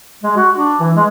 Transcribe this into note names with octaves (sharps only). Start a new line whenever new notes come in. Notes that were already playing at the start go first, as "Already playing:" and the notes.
G#3
F#4
D4
E3
G#3